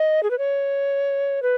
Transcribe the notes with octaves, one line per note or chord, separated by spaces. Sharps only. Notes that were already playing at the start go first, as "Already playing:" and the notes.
Already playing: D#5
G#4
B4
C#5
B4